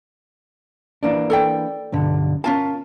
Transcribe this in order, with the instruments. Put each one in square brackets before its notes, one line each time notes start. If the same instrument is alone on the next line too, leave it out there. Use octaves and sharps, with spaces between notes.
[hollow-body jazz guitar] E3 A#3 D4
[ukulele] A4 D5 G5
[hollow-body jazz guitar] B1 G2 D3
[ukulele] C#4 F4 A5 [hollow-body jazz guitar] A#4